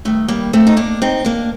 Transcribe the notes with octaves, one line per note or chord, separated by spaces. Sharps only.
G2 D#3 A3
G3 A#3
A3 C4
D#4
A#3 D4
C4 D#4
A#3 D4